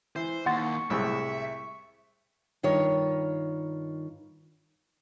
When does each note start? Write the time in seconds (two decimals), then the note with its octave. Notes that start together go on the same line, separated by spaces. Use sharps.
0.16 E3 C5
0.46 D#2 F#5 C6 C#6 A6
0.90 C2 A2 G#3 E5
2.63 G2 D#3 F4 C#5